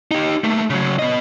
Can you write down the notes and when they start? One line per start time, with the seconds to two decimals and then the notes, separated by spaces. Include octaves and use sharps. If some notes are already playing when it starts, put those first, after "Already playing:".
0.11 D#4 G4
0.44 A3 A#3
0.70 C#3 F#3
0.99 B3 D#5